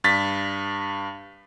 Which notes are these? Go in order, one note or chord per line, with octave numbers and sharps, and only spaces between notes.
G2 A6 B6